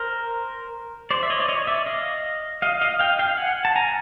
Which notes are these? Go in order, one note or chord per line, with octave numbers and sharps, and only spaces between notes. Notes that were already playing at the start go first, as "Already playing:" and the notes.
Already playing: A#4 C5
C5 D5
E5
C#5 D#5
D5
C#5 D#5
D5 E5
D#5 F5
D#5 F5
D#5 F5
F5 G5
F5 G5
F#5 G#5
A5
G#5 A#5